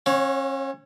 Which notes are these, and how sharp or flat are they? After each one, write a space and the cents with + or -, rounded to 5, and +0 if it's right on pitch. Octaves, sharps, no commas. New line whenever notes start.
C#4 -40 C#5 +0 F#5 -45